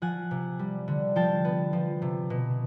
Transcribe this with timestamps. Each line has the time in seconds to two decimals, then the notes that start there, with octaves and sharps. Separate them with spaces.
0.02 F3 F#5 G#5
0.31 C3
0.59 G3
0.88 D3
1.16 F3 G5 A5
1.45 B3
1.73 F3
2.02 C3
2.30 B2